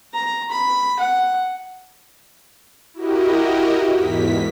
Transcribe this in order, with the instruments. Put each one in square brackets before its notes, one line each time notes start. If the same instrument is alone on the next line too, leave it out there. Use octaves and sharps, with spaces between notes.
[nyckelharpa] A#5
B5
F#5
[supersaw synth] E4 F#4 G4 A#4 D#5
E2 G#2 B6